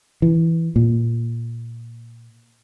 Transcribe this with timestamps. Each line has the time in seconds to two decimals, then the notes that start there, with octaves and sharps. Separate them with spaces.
0.22 E3
0.76 A#2